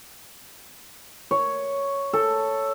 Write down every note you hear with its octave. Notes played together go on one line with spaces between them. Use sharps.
C#5
A4